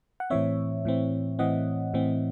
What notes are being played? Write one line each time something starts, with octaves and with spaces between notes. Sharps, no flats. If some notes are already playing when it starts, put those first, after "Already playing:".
F#5
A2 E3 C4 C#5 E5
A2 E3 C4
A2 E3 C4 D#5 F#5
A2 E3 C4